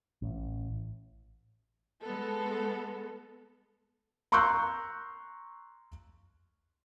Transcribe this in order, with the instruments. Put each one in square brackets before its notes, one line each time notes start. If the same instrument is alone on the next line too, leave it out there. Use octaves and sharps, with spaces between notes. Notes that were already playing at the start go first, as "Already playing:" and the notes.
[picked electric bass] A1
[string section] G#3 B3 A4
[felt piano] A#5 C6 C#6 E6 F#6 G6